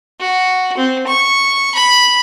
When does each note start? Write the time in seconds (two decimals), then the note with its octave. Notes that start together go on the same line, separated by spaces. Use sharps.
0.20 F#4
0.77 C4
1.07 C#6
1.75 B5